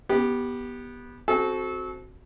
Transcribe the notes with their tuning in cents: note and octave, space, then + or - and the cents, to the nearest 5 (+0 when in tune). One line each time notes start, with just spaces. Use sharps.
B3 -15 G4 +0
C4 +0 F#4 +0 A4 -30